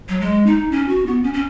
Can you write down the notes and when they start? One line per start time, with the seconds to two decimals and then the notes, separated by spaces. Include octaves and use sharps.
0.09 F#3
0.21 G#3
0.46 D#4
0.72 C#4
0.89 F#4
1.07 B3
1.23 C#4
1.34 C#4